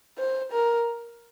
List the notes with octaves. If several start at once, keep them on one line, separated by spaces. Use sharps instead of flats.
C5
A#4